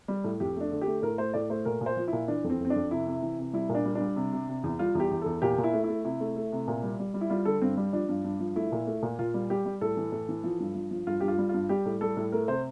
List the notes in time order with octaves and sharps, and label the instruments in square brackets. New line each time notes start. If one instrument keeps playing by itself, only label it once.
[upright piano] G3
A2
F2 G4
A3 D4
D3
G4
A3
A2 A#4
A3 C5
A2 D5
A3 C5
A#2 A#4
A#2
C5
F3
E4
A#2
E3 D4
F2
C4
F2 C4
D4
F2
C3 E4
C3
E3
C3
G3 E4
A#2
D4
G3
D4
G3
C3
C3
C3
E2
G3 F4
E2 G4
E2
E2 A4
A#2 G4
A#2
E4
A3
E4
A3
C3 E4
A3
A3
C3
A#2
G3
G3
G3
E4
G3 F4
D3 A4
G2 C4
G3
F3 D4
G2
G2
F3
A3 E4
A#2
A3
A#2
A#2 F4
G3
G3 G4
G3
A2 A4
E3
A2
E3
F3
G2
F3
F3
G2 F4
G2 G4
F4
G3
G2 F4
G3 G4
A2
G3 A4
A2
A3 A#4
C3 C5